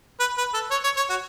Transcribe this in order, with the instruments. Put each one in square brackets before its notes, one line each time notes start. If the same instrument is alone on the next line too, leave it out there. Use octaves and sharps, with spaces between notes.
[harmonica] B4
B4
A4
C#5
C#5
C#5
F#4